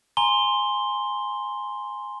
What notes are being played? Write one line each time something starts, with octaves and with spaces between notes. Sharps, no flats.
G#5 A#5 C6 G7